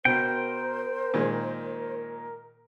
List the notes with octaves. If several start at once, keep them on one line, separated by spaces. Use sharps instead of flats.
B2 A#4 C5 G5
A#2 D#3 G#3